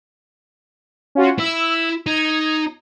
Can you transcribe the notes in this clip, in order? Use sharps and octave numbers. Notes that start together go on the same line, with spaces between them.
C#4 F4 F#4
E4 E6
D#4 G#6